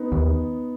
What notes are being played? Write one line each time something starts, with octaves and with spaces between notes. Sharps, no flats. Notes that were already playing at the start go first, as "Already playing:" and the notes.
Already playing: B3 D#4
D#2